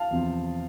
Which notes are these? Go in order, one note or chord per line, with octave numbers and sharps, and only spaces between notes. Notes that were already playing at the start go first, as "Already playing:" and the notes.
Already playing: F5 A5
E2 C3 F3 C4